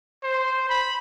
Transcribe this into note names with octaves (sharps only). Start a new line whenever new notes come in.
C5
B5